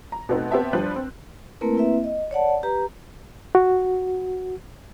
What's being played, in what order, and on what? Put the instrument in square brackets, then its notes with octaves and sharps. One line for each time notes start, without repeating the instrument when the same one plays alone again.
[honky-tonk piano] A#5
B2 A3 B3 C4 D#4
B3 C4 G4 C5 E5 A5
F3 G3 D4 B4 C5 F#6
C4
[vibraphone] A3 A#3 C4 E4 A#4 B4
A#3 C4 E4 B4 E5
D#5
C#5 D5 F#5 A5
G4 B4 A#5
[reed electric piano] F#4